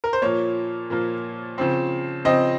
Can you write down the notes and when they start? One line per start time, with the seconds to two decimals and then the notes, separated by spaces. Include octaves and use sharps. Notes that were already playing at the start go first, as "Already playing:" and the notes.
0.04 A#4
0.13 C5
0.22 A#2 F3 A#3 C#5
0.90 A#2 F3 A#3
1.58 C#3 F3 C4
2.25 C#3 F3 C4 D#5